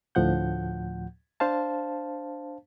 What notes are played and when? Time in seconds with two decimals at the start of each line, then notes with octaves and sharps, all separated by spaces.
0.15 D2 A2 F3 F#5 G6
1.40 D4 C5 F5 A5